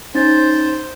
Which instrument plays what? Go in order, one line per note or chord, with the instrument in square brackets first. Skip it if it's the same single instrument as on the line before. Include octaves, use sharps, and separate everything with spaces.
[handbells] C#4 D#4 A6 [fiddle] C5